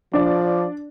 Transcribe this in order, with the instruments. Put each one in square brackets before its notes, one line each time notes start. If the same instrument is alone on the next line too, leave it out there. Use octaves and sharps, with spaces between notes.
[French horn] F3 [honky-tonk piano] D4 D5